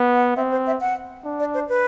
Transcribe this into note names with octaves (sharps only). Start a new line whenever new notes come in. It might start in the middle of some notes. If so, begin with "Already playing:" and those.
Already playing: B3
F#5
C4 E5
C5
E5
F#5
D4
D5
C5
B4